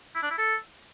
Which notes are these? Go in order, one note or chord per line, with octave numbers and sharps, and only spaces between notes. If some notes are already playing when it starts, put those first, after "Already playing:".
E4
D4
E4
A4